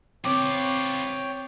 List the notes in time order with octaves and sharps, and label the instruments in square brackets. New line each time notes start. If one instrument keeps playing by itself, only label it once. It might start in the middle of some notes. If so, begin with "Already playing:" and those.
[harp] C4 [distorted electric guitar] F4 B4 [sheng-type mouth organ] C#5 G5 [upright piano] D6